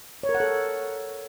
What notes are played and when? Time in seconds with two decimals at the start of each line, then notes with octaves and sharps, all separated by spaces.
0.23 C#5
0.29 A#4
0.35 F#5
0.40 A4